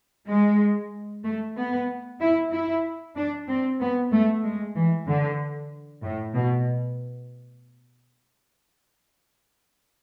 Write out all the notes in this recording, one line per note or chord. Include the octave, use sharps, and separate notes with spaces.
G#3
A3
B3
E4
E4
D4
C4
B3
A3
G#3
E3
D3
A2
B2